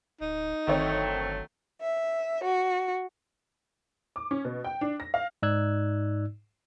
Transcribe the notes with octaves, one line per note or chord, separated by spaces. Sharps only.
D1 D#4
G1 D3 D#3 F#3 A3 C4 C#5
E5
F#4
D6
C#4
B2
G5
D4
A#6
F5
G#2 D#4 D5 E6 F#6 G#6